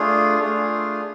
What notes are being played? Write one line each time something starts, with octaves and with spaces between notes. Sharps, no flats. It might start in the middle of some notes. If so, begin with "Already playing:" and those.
Already playing: A3 D4 F4 G#4
A3 D4 F4 G#4